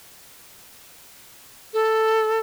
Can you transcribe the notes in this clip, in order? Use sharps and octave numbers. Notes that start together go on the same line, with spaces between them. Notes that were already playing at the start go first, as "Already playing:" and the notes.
A4